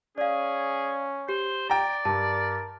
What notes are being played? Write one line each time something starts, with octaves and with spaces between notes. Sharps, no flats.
C#4 G#4 D5 F5
G4 C5
D5 G5 A#5
G2 A#4 A5